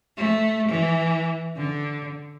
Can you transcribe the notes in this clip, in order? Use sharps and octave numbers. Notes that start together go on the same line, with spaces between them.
A3
E3
D3